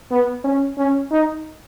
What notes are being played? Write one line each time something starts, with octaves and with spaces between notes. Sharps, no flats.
B3
C#4
C#4
D#4